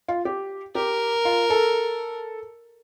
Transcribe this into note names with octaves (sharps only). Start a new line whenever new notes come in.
F4
G4
G4 A#4
F4
A4